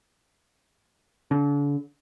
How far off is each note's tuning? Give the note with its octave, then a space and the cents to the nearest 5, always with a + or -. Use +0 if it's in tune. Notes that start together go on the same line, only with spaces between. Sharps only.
D3 -40